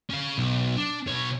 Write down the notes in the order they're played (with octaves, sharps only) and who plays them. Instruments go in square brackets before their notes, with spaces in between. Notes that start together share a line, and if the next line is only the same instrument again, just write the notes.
[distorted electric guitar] C#4 F5
B1
D4
B2 C#5